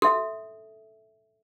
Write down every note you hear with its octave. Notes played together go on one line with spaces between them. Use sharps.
A4 E5 C6